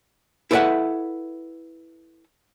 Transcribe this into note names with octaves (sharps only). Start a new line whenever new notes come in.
E4 A4 B4 D5 E5 F#5